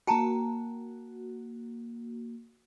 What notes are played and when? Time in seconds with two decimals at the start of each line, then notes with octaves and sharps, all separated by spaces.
0.07 A#3 F#4 G5 A5 A#5